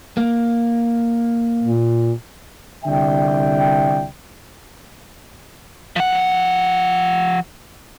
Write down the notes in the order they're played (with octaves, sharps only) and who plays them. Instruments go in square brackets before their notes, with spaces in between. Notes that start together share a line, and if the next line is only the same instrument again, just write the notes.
[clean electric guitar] A#3
[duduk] A#2
[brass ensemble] C2 D3 D5 E5 G5
[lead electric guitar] F3 F#5